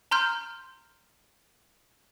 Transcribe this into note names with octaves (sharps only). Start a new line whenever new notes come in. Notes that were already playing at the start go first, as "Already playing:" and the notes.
A#5 C6 F6 G6